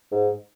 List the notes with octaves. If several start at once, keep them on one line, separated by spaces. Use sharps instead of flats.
G#2